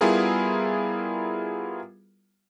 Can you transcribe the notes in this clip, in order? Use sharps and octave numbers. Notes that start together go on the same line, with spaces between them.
G3 B3 E4 F4 G#4 A#4